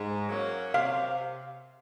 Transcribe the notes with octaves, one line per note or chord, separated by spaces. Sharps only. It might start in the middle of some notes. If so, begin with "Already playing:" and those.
Already playing: G#2
F#3 A#3 C#4
C3 F5